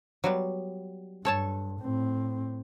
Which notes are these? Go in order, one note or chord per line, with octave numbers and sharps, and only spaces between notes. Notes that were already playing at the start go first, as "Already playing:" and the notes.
F#3 G3 B3
G2 A4 C#5 A5
A2 C4